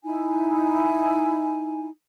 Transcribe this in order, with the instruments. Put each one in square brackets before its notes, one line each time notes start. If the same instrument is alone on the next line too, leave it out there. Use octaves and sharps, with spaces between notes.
[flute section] D#4 E4 G#5